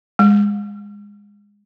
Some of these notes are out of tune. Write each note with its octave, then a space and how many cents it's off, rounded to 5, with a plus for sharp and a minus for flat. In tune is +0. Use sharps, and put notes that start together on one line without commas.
G#3 -20